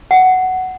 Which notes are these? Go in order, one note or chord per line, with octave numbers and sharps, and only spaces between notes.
F#5